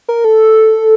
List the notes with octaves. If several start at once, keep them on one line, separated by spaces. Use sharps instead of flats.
A#4
A4